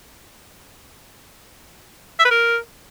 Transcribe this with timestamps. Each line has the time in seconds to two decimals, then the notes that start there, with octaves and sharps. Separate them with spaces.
2.19 E5
2.25 B4
2.31 A#4